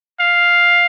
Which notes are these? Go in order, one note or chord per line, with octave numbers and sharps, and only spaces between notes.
F5